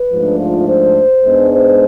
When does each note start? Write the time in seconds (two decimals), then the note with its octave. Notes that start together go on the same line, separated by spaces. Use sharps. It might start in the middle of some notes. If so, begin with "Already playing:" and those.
Already playing: B4
0.12 G#2 F3 A3 D4
0.40 F4
0.68 C5
1.24 G#2 G#3 B3 D4
1.52 C5